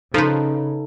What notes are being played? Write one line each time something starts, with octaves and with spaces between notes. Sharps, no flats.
C#3 F3 D#4 A4 B4